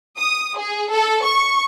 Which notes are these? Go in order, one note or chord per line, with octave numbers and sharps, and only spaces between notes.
D#6
G#4
A4
C#6